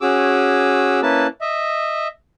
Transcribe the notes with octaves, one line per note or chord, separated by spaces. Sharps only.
C#4 F#4 G#4 D6 E6
A#3 C#4 E4 B4 A5
D#5 E5